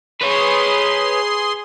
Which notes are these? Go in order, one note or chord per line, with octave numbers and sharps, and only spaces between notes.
G#4 B4 C#5 C6